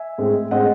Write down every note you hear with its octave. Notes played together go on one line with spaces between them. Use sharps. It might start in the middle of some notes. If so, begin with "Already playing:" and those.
Already playing: E5 G#5
A2 G#3 C4
A2 G#3 C4 D#5 F#5